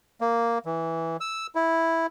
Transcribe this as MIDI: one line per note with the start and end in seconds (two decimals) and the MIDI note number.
0.21 0.58 58
0.66 1.17 52
1.21 1.47 88
1.55 2.06 64